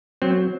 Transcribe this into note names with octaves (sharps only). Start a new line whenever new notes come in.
F#3 C4